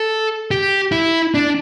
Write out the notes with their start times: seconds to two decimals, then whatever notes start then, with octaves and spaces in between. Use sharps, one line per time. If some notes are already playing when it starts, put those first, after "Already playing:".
Already playing: A4
0.51 G4
0.92 E4
1.34 D4